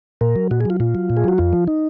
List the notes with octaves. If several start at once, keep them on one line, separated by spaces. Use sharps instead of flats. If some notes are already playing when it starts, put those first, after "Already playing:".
A#2 A#4
F#3
A#2 F#4
G#4
F#3 F4
A#2 F4
F#3
A#2
G#4
F#3 F#4
F2 F4
F3
D#4